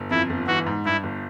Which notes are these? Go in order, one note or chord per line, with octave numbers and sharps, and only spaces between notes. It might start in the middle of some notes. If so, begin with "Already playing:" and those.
Already playing: G1
F2 E4
G1
E3 F#4
G#2
G2 E4
G1